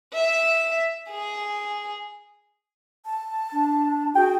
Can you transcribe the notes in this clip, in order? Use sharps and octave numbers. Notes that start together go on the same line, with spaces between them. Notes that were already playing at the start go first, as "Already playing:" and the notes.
E5
G#4
A5
D4
F#4 G#4 G5